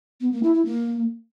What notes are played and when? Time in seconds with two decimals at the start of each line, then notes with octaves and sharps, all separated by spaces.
0.21 B3
0.32 A#3
0.43 E4
0.54 E4
0.65 A#3